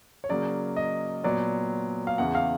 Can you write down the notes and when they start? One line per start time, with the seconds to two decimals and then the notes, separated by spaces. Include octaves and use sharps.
0.24 C#5
0.29 C#3 F#3 A#3 D5
0.76 D#5
1.24 A#2 F#3 B3 D5
2.07 F5
2.18 E2 C#3 E3 F#5
2.35 F5